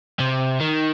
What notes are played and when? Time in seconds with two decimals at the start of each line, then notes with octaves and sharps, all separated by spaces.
0.20 C3
0.61 D#3